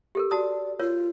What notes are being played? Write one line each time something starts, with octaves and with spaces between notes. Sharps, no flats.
G4 A4 A#4
F#4 D5 A5 D#6
F4 A#4 C#5